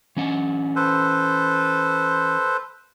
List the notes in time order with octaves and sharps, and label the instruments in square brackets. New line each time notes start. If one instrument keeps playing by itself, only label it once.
[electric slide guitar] E3 C#4 F#5
[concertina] A4 B4 C5